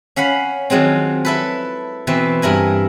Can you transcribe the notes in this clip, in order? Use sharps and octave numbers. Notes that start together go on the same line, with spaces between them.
C#4 F5 F#5 B5
D#3 F3 F#3 G#3 C4
E4 A4 B4
B2 E3 C4 B4
G2 E4 A#4 G#5